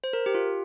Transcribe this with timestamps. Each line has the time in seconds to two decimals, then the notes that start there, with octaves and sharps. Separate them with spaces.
0.04 C5
0.13 A#4
0.26 G4
0.35 F4